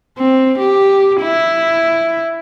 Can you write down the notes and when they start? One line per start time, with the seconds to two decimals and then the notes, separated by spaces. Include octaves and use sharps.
0.18 C4
0.59 G4
1.22 E4